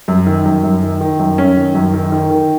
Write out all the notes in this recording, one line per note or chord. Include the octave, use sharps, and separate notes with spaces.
F#2
D#3
F#2
F#2
D#3
D#3
F#2
F#2 C#4
D#3
F#2
D#3
D#3
D#3